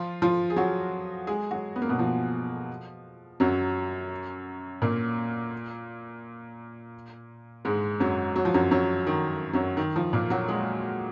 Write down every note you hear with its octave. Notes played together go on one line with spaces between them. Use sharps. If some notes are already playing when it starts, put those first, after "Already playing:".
Already playing: F3 F4
F3 F4
G#4
F#3 F#4
G#3 G#4
F#3 F#4
B3
A#3
B2 B3
F3
F#2 F#3
A#2 A#3
G#2 G#3
F#2 F#3
F#3
F3
F#2 F#3
F#2 F#3
D#3
F#2 F#3
D#3
F3
A#2 A#3
F#3 F#4
G#3 G#4